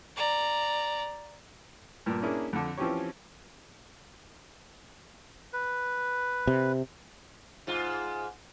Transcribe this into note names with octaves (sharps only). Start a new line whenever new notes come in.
D5 A#5
G2 A#2
A#3 C#4 D4 E4 G#4
F2 D3
E3 F3 C4 C#4 G4 C#5
B4
C3
G#2 F4